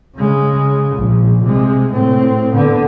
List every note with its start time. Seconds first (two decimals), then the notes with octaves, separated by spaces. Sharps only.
0.16 C#3 G#3
0.95 A#1
1.44 C3 G#3
1.93 A2 C4
2.54 D3 B3